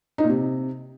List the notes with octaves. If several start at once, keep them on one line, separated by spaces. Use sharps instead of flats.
D#4
A#2
C3